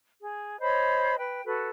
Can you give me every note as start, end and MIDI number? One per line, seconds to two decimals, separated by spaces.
0.21 0.60 68
0.60 1.15 72
0.60 1.15 73
0.60 1.15 75
0.60 1.15 83
1.18 1.42 71
1.18 1.42 79
1.44 1.68 66
1.44 1.68 69
1.44 1.68 71